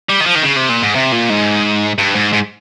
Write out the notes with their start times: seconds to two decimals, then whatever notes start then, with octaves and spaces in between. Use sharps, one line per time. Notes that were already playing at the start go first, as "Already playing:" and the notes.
0.09 G3
0.21 D#3
0.26 F3
0.35 D#3
0.43 C#3
0.57 C3
0.69 A#2
0.83 G#2
0.95 C3
1.12 A#2
1.30 G#2
1.99 G2
2.15 G#2
2.33 G#2